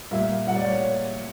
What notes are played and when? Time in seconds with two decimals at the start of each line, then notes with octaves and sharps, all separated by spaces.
0.11 A#2 G3 A#3 E5
0.47 A#2 G3 A#3 F#5
0.56 D5
0.65 C#5